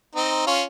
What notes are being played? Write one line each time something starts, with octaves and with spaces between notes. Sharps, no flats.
C4 D#4
C#4 F4